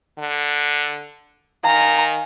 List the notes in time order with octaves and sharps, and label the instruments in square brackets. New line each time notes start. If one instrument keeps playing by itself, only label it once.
[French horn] D3
[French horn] D#3 [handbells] F5 G#5 [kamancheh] A#5